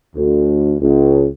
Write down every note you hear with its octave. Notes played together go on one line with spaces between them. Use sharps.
D2
C#2